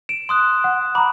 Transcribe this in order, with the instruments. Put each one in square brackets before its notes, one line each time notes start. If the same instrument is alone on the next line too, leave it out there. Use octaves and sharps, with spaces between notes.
[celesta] D7 [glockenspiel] E7
[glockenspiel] C6 D#6 F#6
[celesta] F#5
[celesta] A#5 D6 [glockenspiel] B5